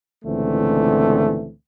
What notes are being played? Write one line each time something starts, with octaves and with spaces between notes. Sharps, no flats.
C#2 A#2 D3 E3 A3 C4